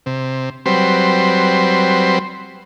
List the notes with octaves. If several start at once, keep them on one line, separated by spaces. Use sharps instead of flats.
C3
F#3 G3 C4 B4 C5